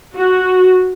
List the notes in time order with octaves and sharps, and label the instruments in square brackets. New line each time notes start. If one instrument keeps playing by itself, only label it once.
[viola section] F#4